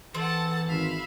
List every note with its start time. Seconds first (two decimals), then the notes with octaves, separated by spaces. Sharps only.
0.14 E3 C4 A4 F#5 A5
0.67 G#1 E5 F5 B5